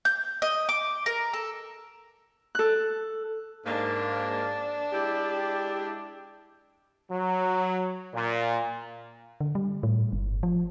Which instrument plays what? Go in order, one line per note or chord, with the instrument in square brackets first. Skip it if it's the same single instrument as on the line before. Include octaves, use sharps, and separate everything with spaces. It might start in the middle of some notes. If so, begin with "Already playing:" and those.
[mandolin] G6
D#5
D6
A#4
A4
[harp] A4 F#6
[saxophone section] G#2 A#3 [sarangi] D4
[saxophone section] G#3 E4 G4
[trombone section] F#3
A#2
[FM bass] D3
G3
A2
G1
F3